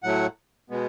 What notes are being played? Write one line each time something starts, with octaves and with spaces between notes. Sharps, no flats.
A2 F#3 A3 F#5
B2 G#3 B3